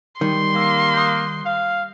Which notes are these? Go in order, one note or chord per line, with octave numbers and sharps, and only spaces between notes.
D#3 G3 C6
A#3 D6 E6
D#6 F#6 G6
F5